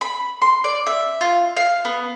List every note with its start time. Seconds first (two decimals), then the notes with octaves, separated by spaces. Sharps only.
0.01 B5
0.42 C6
0.64 D5
0.87 E5
1.21 F4
1.57 F5
1.85 B3